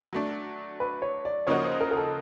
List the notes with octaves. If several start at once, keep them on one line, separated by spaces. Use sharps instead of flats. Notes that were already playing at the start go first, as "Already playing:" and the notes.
F#3 A3 D4
B4
C#5
D5
C#3 F3 A#3 D#4 F#4 C#5
C5
A#4
A#4
A4